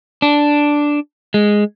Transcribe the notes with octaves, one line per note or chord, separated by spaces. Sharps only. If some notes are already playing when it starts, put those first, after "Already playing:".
D4
G#3